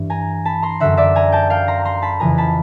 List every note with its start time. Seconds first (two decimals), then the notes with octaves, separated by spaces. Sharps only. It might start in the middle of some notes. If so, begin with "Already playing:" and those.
Already playing: G2 E3
0.10 G#5 A#5
0.45 A5 B5
0.62 A#5 C6
0.80 F#2 D3 E5 F#5
0.97 D5 E5
1.16 G#5 A#5
1.32 G5 A5
1.50 F5 G5
1.68 A#5 C6
1.85 A#5 C6
2.02 A5 B5
2.20 F2 C#3 E3 G#5 A#5
2.38 A5 B5